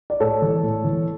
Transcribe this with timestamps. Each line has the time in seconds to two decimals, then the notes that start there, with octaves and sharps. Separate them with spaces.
0.10 D5
0.20 A2 A4 C#5
0.42 E3
0.63 A2
0.84 E3